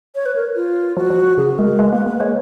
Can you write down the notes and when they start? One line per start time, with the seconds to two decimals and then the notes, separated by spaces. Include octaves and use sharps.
0.15 C#5
0.26 B4
0.36 A#4
0.56 F4
0.97 F3 F#4
1.10 F3
1.38 C#3 G#4
1.58 G#3 A#4
1.79 G#3 B4
1.93 A#3 B4
2.06 A#3 B4
2.20 G#3 C#5